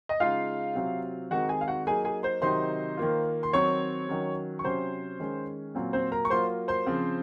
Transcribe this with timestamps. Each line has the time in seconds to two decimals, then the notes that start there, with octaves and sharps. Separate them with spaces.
0.09 D#5
0.20 C#3 G#3 D#4 F4 F5
0.75 C3 F#3 C4 F4
1.31 D#3 G#3 C4 D#4 F#4 F#5
1.49 G#4 G#5
1.61 F5
1.67 F#4 F#5
1.87 F#3 A#3 D#4 G#4 G#5
2.05 G#4 G#5
2.23 C5 C6
2.42 C3 D#3 F#3 C4 D#4 C5 C6
2.97 D#3 A#3 F4
3.43 C6
3.53 D#3 F#3 C4 C#5 C#6
4.08 D#3 F#3 C#4
4.59 C#6
4.64 C3 F#3 C#4 C5 C6
5.20 D#3 G#3 C#4
5.75 A#2 F#3 C4 F4
5.93 C4 C5
6.12 A#4 A#5
6.25 C#6
6.30 F#3 A#3 F4 C5 C6
6.68 C5 C6
6.86 C#3 F3 C4 F4